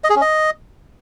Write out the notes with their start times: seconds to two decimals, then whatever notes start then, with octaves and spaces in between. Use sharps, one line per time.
0.04 D#5
0.10 G#4
0.16 C#4
0.21 D#5